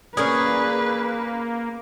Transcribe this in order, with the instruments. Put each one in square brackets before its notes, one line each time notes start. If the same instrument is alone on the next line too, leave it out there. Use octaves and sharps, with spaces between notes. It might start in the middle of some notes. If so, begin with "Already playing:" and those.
[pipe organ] A#3 [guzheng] C#4 A#4 D5 [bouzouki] G#4 [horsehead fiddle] B4